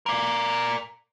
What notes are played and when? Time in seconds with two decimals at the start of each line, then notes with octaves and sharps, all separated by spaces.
0.06 A#4 D5